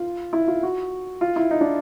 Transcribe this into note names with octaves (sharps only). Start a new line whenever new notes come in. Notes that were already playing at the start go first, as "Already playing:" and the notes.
Already playing: F4
E4
F4
F#4
F4
E4
D#4
D4